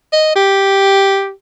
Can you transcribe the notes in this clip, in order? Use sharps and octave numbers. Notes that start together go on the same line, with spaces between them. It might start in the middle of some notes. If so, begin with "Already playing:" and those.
D#5
G4